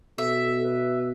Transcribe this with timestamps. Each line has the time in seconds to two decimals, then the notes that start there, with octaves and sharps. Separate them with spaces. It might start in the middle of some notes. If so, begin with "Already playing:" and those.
0.18 B2 A4 E5
0.63 B4